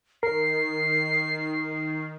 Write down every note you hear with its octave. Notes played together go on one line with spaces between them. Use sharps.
D#3 A#4 C7